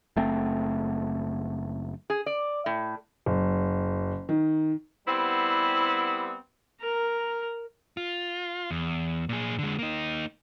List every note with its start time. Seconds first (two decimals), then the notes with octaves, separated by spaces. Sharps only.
0.16 F#1 A3 C4
2.10 G#4
2.26 D5
2.66 A2
3.26 F#1
4.29 D#3
5.07 G3 B3 C4 E4
6.81 A#4 A#5
7.97 F4
8.71 E2
9.29 A#2 G#4
9.59 D3 G#3
9.79 A#3 D#4